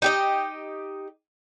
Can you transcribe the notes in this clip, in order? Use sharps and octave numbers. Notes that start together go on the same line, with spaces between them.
D#4 G4 D#5